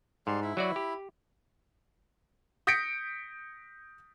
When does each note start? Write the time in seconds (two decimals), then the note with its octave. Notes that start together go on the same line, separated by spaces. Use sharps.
0.27 G#2 G3 D5 C6
0.42 E4 B5
0.57 F#3 F#4 D5
0.76 G4
2.67 D#6 G6 A#6 B6 C#7 D7